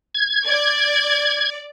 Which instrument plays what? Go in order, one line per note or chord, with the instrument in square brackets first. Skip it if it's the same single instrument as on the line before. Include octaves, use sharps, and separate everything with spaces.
[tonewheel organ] G#6
[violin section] D5